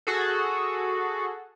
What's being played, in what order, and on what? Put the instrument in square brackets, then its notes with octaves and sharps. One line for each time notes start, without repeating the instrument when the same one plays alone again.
[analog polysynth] F#4 G#4 A4